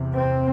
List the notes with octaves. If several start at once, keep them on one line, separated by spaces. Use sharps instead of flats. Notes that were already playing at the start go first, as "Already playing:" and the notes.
Already playing: E2 C3
C4